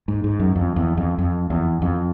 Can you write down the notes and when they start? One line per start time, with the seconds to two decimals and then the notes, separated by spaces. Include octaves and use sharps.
0.08 G#2
0.24 G#2
0.40 F#2
0.56 F2
0.76 E2
0.97 F2
1.18 F2
1.50 E2
1.82 F2